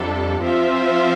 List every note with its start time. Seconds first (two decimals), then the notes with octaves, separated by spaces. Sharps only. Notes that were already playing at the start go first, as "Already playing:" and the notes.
Already playing: F2 C3 G3 D4 A4
0.42 F3 C4 F4 C5 E5